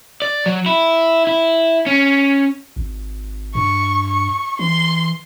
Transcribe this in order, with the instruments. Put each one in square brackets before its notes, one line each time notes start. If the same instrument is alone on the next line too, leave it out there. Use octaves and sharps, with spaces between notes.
[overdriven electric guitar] D5
F#3
E4
E4
C#4
[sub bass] G#1
[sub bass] G2 [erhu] C#6
[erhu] C#6
[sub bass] E3 [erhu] C6